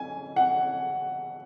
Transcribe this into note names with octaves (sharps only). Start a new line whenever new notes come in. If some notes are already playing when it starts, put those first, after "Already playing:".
Already playing: G#5
F#5